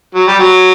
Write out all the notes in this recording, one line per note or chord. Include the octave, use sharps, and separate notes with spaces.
F#3
G3
F#3